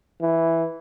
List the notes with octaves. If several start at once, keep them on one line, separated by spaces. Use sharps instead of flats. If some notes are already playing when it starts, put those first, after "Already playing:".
E3